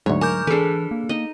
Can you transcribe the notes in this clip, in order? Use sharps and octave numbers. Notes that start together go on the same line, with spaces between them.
D2 G#2 F#3 C#5
A#4 G#5 D6 G6
E3 D4 G#4 A4 B4
A#3
D#4 D#5